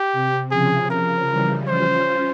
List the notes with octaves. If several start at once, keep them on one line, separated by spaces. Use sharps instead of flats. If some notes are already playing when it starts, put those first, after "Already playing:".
Already playing: G4
C3
C#3 F3 G#4
C#3 F3 A#4
E3 G3
C#4 F4 C5